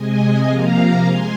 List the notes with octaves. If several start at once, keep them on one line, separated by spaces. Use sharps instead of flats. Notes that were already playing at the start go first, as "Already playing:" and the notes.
Already playing: C3 G#3 D#5 G#5
C3 F3 A#3 F5 A#5
G#3 G#5 C6